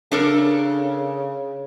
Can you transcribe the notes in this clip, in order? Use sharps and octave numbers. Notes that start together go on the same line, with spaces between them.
C#3 D4 A4 A#4